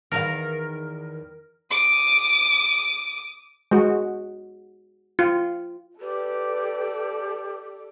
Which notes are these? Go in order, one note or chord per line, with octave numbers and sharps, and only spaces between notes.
E2 D#3 A#4 F5
D6 D#6
G#3 F#4
F4
G4 A4 B4 D5